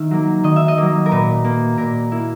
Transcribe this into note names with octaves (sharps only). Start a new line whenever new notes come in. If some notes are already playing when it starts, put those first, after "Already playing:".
Already playing: D#3 E5
F#3 A#3
D#3 D#5
E5
D#5
F#3 A#3
A#4
A#2 B4
A#3
A#2 A#4
A#3 E4